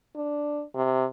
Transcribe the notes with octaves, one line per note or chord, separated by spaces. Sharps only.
D4
C3